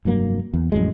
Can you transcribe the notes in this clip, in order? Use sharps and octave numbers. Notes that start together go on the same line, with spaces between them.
F1 G2 F#3 A#3
E2
A1 F2 F#3 G#3